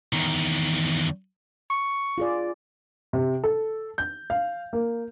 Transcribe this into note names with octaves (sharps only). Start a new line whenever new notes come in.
E2 D#3
C#6
F4 G#4 D5
C3
A4
G6
F5
A#3